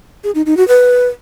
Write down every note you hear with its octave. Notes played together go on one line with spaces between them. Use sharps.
G#4
D#4
D#4
F#4
B4